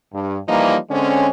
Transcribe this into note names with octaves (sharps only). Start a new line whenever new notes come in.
G2
E3 F3 G3 A#3 D#4
D3 G#3 C4 C#4